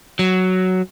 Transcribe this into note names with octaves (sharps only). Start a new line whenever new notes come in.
F#3